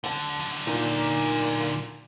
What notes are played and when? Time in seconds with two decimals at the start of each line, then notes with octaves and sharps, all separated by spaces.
0.04 D3 F#3 F#5 A5
0.40 D3 F#3
0.67 A#2 D#4